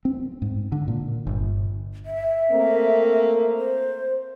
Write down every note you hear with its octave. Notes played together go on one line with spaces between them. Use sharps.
C4
G#2
D3
A#2
G1
E5
A3 A#3 C4
C5